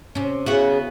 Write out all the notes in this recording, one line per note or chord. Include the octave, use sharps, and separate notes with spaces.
C3 C#4
C#3 B3 E4 F#4